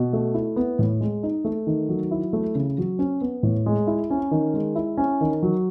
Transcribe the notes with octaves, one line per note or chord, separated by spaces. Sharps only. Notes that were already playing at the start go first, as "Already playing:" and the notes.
Already playing: B2
A3
E4
B3
A2
G#3
D#4
A3
D#3
F#3
E4
A3
C#3
F#3
C#4
B3
A2
G#3
E4
C#4
D#3
G#3
E4
C#4
D#3
F#3